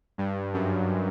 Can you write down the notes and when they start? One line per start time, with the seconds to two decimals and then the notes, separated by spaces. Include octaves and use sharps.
0.18 G2
0.54 F#2